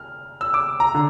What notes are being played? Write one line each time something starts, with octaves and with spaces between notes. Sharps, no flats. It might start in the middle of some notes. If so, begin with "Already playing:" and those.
Already playing: F6
E6
D6
A#5
D3